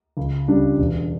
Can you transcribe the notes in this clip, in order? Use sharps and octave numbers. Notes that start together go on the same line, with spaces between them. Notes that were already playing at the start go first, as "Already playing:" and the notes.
C#2
C#3 G3 D4
E1